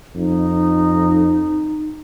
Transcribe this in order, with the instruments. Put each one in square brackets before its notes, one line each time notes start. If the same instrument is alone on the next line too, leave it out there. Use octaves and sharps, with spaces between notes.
[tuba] F2 [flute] D#4